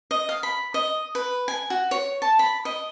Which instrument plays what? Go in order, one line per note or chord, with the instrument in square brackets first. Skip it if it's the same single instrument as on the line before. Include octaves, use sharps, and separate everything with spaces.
[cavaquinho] D#5
F5
B5
D#5
B4
G#5
F#4
C#5
A5
B5
D#5